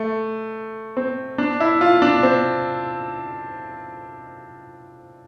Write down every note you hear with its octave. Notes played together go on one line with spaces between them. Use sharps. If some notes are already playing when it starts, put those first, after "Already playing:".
Already playing: A3
C4
D4
E4
F4
D4
C4